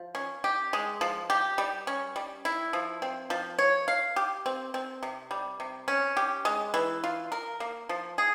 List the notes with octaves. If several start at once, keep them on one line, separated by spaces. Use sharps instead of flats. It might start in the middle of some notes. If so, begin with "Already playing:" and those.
Already playing: F3
C#4
G4
G#3
F3
G4
G3
C#4
G3
E4
F3
C4
F3
C#5
F5
G4
C4
C4
C3
G3
C3
C#4
G4
G#3
E3
F4
A#4
A#3
F3
G#4